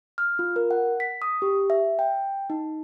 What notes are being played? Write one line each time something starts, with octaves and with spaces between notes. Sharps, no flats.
F6
F4
A#4
F#5
B6
D#6
G4
E5
G5
D#4